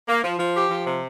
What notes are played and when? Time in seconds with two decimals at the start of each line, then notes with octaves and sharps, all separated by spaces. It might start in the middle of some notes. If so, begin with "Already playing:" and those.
0.08 A#3
0.24 F3
0.39 F3
0.55 G4
0.70 F3
0.86 C3